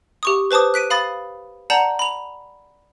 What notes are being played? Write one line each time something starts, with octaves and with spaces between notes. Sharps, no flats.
G4 C#6 D#6
B4 C5 A5 D6 D#6
F#6 B6 D7 D#7
F5 B5 D#6 A6
D5 F#5 A5 A#5 G6 F#7
B5 F7